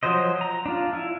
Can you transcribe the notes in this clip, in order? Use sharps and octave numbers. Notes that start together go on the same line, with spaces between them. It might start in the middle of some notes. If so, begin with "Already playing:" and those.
F3 F#3 C5 D#5
A#5
D4 F4
E4